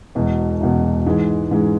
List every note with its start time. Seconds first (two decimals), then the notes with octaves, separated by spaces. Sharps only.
0.15 E1 E2 B2
0.61 E1 E2 B2
1.06 G#2 E3 G#3
1.51 G#2 E3 G#3